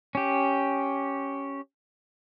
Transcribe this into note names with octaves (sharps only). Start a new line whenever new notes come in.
C#4 G4